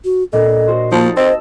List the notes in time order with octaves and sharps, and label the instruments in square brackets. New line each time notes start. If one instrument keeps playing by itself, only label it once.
[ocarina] F#4
[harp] A#2 D4 [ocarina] A4 [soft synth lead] D#5
[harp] F#4 C5
[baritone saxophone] F3 [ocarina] A#3 [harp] D#4 A5
[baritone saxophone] C4 [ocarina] C5 [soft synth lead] D#5 [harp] E6